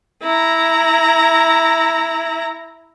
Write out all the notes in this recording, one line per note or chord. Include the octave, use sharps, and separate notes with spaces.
E4 A#5